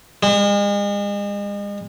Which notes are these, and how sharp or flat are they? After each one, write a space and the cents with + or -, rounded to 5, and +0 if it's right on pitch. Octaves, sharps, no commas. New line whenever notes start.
G#3 -40